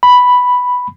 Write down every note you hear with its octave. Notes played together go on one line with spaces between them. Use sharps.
B5